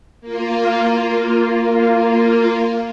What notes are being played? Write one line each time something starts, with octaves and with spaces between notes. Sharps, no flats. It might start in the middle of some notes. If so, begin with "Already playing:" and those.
A#3 F4